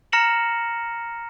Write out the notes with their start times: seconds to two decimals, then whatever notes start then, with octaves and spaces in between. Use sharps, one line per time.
0.12 A#5 F6 A#6 C#7 E7 F#7